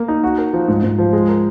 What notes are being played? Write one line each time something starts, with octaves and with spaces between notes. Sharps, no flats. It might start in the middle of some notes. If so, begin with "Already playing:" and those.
Already playing: A#3
D#4
F#4
A#4
F3
G#2
G#2
F3
G#3
A#4